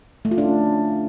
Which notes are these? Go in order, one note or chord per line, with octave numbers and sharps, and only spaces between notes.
A3
F4
D4
C#4